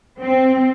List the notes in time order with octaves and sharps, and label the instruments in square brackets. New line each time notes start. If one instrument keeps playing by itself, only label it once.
[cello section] C4